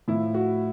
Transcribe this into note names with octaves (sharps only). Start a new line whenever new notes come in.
A2 F3 E4
F#4